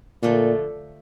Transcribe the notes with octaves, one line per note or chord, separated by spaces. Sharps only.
A#2 D3 F3 A3